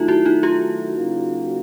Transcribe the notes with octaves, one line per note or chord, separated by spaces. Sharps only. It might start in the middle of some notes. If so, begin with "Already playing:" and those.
Already playing: D#3 F#3 A3 D#4 F4
E4 F#4
D#4 F4
F4 G4
C#3 F#3 A#3